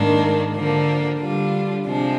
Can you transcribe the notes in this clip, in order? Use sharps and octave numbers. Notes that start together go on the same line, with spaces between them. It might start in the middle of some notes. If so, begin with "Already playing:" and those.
Already playing: G#2 D#3 A#3 D4
D3 F3 A#3 D4
D3 G3 D4 F4
C3 F3 G#3 D4